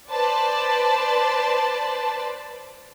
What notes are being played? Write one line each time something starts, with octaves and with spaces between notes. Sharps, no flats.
B4 C5 D5 A5